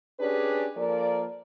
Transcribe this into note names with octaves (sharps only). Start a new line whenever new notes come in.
C#4 D4 G4 G#4 B4 D5
F3 A#3 A4 A#4 D5